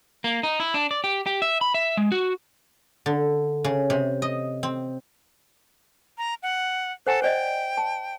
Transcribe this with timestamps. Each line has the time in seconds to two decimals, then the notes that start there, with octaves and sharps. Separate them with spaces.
0.24 A#3
0.43 D#4
0.60 E4
0.74 D4
0.91 D5
1.04 G4
1.26 G4
1.42 E5
1.61 B5
1.74 E5
1.97 G#3
2.12 F#4
3.06 D3
3.64 C#3
3.90 C3
4.22 D#5
4.63 C4
6.18 A#5
6.43 F#5
7.07 A4 C5 F#5 G#5
7.22 C5 D5 D#5 G5
7.77 A5